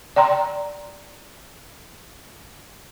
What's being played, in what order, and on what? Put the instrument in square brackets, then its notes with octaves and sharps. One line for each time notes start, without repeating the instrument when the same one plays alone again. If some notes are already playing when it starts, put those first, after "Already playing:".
[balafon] D5 G5 A#5 C6